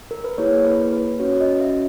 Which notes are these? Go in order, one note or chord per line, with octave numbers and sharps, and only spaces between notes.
A#4
B4
A#3 E4 G#4 C#5
B4
B4
C#4 F#4 C#5
D#5
E5